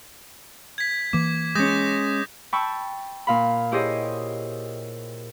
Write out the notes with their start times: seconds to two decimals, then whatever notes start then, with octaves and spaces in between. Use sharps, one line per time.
0.78 G#6 B6
1.13 E3 A#3 D6
1.55 G#3 C#4 D#6 G6 A#6
2.53 G5 A5 B5 C#6 E6
3.27 A#2 F5 B5
3.72 E4 G4 G#4 C5 C#5 D#5